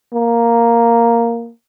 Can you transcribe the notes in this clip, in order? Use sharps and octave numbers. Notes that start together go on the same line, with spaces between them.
A#3